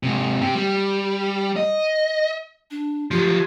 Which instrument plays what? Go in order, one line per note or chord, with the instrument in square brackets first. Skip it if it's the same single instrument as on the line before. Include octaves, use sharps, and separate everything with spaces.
[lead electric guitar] G#2 C3
C3 G4
G3
D#5
[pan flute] D4
[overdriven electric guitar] F3 F#3 [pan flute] G4